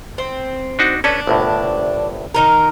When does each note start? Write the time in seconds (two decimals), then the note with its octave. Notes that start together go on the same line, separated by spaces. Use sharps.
0.18 C4
0.79 D4 D#4 F#4
1.04 C#4 D4 A4 B4
1.27 G1 C2 A2
2.34 D#3 D#4 A#4